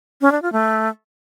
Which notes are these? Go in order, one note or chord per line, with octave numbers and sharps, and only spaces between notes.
C#4
D4
F4
A3